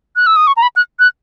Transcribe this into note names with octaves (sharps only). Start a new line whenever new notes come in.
F#6
E6
D#6
C#6
A#5
B5
F#6
F#6